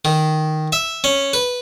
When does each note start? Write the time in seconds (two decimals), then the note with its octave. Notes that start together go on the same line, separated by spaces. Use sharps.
0.05 D#3
0.72 E5
1.04 C#4
1.33 B4